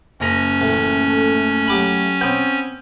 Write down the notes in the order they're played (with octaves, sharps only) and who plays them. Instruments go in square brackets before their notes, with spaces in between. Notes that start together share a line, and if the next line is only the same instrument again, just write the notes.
[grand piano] F#1 A#6 F7 [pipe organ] C#4
[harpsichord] A1 [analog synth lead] A3
[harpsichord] F#3 G4 B5
[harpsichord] B3 C4 C#5 [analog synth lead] G5 [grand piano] G6